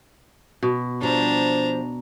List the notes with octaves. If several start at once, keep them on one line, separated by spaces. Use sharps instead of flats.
B2
F3 G3 D4 A#5